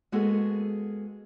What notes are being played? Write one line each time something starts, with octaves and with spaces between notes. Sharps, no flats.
G#3 A#3 B3 F#4 G#4 A4